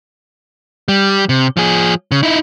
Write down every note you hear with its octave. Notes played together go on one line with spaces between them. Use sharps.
G3
C3
F3 G#4
C#3
D#4 E4